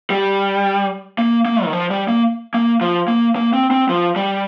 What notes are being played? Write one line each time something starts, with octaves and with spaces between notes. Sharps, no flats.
G3
A#3
A#3
D#3
F3
G3
A#3
A#3
F3
A#3
A#3
C4
C4
F3
G3